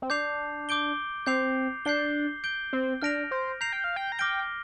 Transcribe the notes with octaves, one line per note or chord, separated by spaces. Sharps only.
C4
D4 D6 G6 C7 F7
D6 G6 D7 G7
C4 D6 G6 C7 F7
D4 G6 C7 G7
G6 D7 G7
C4
D4 F6 A#6 D7 F7
C5
A#5 G6 C7 F7
G5
F5
G5
A#5
G5 D6 F6 A#6 D7 G7